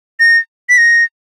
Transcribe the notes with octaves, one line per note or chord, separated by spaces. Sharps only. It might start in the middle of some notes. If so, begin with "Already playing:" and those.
A#6
B6
A#6